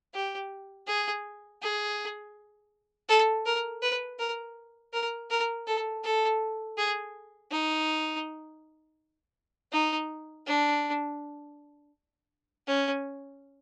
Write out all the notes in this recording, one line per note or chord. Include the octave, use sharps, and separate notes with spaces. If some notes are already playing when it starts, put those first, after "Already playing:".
G4
G#4
G#4
A4
A#4
B4
A#4
A#4
A#4
A4
A4
G#4
D#4
D#4
D4
C#4